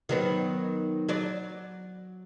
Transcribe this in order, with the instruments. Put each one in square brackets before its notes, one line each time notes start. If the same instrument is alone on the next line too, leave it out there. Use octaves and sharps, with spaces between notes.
[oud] D#3 F#3 B3
F#3 D5